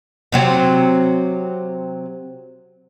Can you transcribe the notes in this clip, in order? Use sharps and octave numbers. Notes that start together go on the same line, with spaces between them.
C3 F#3 C4